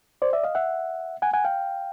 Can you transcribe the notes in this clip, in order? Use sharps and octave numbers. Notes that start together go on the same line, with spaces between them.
C5 D5
D5 E5
D#5 F5
E5 F#5
F#5 G#5
F#5 G#5
F5 G5